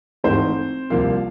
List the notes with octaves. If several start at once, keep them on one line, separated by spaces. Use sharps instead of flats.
G#1 G#2 E3 A3 C4 C5
C2 C3 F3 A#3 F4 F5